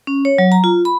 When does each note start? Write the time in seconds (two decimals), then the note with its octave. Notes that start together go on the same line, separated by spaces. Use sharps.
0.07 C#4
0.25 C#5
0.38 F#3
0.52 A#5
0.64 F4
0.85 B5